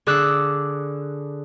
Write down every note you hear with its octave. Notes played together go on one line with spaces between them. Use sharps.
D3 G#4 D5 D6 E6 F#6